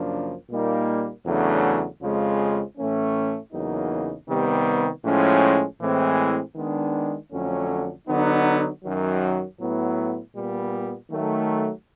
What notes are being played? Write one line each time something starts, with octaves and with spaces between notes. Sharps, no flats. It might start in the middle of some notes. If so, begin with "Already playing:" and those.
Already playing: F#2 C#3 F3 A#3 D4
A#2 G3 A#3 D#4
E2 C#3 F#3 A3 D4
F2 C#3 F3 G#3
A2 E3 A3 C#4
E2 C#3 F#3 A#3 D#4
C3 D#3 G3 B3
A2 F3 G#3 C#4
A2 E3 G#3 C4
D#3 G#3 B3 D4
F2 D3 F#3 A3 C#4
D3 F#3 B3 D#4
F#2 D#3 F#3
A2 F#3 B3 E4
A#2 G3 B3
D#3 F#3 A3